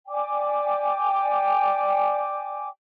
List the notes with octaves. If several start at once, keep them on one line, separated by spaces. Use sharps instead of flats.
D5 G5 G#5 D6